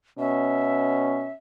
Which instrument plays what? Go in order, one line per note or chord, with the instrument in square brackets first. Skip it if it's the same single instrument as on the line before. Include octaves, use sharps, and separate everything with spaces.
[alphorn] B2 [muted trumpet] C#4 [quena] E5